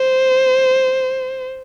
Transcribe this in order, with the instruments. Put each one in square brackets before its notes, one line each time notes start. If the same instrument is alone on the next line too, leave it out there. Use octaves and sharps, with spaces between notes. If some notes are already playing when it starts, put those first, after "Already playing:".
Already playing: [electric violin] C5